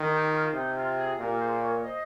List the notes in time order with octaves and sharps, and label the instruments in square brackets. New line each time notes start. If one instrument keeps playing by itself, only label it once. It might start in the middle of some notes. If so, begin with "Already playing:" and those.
Already playing: [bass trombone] D#3
[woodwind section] D#4 G4
F4
F4
[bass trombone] C3 [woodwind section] D#4
[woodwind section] F4
F4 G#4
[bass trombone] A#2 [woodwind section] G4 A#4
[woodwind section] G#4 C5
A#4 C#5
C5 D#5